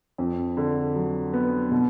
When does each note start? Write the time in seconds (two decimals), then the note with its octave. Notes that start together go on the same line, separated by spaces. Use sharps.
0.18 F2
0.57 D3
0.95 F#3
1.34 B3
1.71 B2